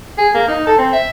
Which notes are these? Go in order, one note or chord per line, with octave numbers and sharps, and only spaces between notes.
G#4
A#3
D#4
A4
C4
E5